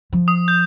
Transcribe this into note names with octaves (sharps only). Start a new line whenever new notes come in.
F3
D#6
G6